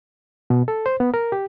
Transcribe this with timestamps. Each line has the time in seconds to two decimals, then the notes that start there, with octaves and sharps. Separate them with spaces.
0.50 B2
0.68 A4
0.86 C5
1.00 B3
1.14 A#4
1.32 G4